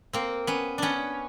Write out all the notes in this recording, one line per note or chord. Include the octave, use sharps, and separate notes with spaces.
A#3 C4
B3 C#4
B3 C#4 D4